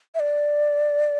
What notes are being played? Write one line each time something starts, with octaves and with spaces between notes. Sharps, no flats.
E5
D5